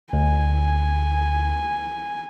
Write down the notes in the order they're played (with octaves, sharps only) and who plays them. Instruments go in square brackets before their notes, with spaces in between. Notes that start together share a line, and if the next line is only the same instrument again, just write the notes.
[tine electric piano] D2 [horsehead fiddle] G#5